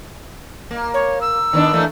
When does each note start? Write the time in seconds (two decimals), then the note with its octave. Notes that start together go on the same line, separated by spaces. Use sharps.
0.71 A#3
0.94 C#5
1.21 E6
1.53 D#3 B3 D4
1.73 E3 A3 A#3